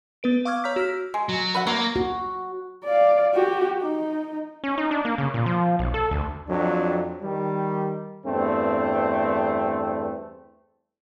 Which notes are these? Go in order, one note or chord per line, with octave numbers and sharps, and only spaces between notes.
B3 B4 D7
F5 C#6 D6 E6 F6 G#6
C#5 A#5 E6 F6 G6 B6
F#4 E6 F6 B6
G#3
F#3
B4 E5 F#5
F#3 A#3
F#4
D5 F5
F#4 G4
D#4
C#4
D#4
D4
A#3
C#3
A#2
F3
B1
A4
D2
F2 F#3 D4
D#3 G3
E2 G2 A3 B3 C4